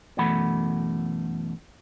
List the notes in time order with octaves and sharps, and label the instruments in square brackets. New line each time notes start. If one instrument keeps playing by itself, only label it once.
[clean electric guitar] F#2 B2 E3 A3 F#5 B5